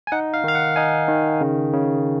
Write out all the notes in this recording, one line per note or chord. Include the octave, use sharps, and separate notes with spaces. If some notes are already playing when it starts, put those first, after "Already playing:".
G#5
D#4 F#5
F5
D#3 F5
F#5
D#4 G#5
D#3
C#3
C#3